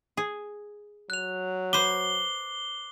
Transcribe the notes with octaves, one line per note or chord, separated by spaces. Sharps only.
G#4
F#3 F#6 F7
B4 C5 D6 C7 G7